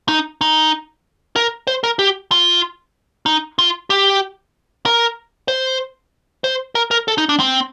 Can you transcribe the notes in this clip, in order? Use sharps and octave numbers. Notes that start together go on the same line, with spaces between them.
D#4
D#4
A#4
C5
A#4
G4
F4
D#4
F4
G4
A#4
C5
C5
A#4
A#4
A4
D#4
D4
C4